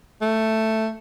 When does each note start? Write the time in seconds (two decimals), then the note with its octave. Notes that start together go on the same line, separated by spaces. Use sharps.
0.21 A3